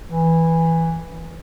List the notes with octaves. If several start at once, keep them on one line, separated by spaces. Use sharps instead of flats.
E3